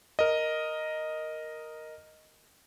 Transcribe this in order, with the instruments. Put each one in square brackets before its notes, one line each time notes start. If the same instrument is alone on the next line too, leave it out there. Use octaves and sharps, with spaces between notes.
[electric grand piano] A#4 D#5